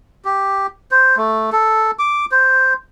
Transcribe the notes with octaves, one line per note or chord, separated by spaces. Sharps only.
G4
C5
A3
A4
D6
C5